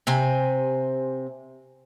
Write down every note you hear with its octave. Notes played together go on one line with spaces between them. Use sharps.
C3 C5 G#5